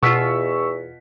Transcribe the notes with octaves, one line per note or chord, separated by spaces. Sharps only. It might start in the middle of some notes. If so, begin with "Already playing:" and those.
E2 B2 F4 C#6 E6 B6